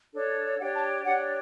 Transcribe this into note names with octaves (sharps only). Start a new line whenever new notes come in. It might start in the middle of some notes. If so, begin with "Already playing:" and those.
D4 A4 C#5
D4 G4 C#5 F#5
A5
D4 G4 C#5 F#5